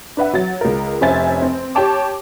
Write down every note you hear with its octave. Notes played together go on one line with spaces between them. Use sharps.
D4 B4 E5 F#5
F#3 A6
C#2 A#4
F1 C#4 C5 E5 G#5 A6
C4
G4 C#5 G5 A5 D6